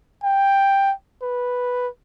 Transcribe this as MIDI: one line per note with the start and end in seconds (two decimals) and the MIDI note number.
0.24 0.93 79
1.22 1.88 71